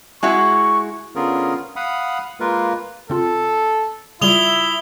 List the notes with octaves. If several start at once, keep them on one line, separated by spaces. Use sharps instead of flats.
G#3 E4 F#4 C#6
D3 B3 C#4 F4 G#4 A#4
F5 F#5 B5 D#6
G#3 A#3 F4 A#4 B4
C#3 C4 F4 A4
C#3 G3 E4 F4 E5 D#6 F7 G7